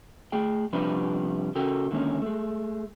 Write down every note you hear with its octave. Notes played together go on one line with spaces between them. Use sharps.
A3 G#4 G5
C3 F3 G3 D4 G4 B4
C#3 F#4 A4 A#4 G5
D3 D#3 G#3 A#3 C#4
G#3 A3